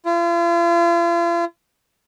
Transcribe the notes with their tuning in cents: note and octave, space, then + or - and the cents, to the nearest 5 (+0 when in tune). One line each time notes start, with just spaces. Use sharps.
F4 -40